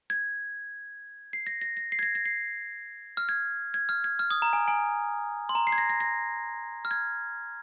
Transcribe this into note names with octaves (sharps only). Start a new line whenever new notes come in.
G#6
C7
A#6
A#6
A#6
C7
G#6
A#6
A#6
C7
F6
G#6
G#6
F6
G#6
F6
D#6
A#5
G#5
G#5
C6
A#5
C7
G#6
A#6
A#6
A#6
F6
G#6